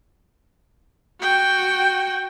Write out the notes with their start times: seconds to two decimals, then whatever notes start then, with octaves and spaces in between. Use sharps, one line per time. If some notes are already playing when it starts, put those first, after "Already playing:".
1.20 F#4 G5